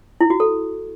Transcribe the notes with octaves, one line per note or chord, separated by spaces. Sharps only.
E4
F#4
A4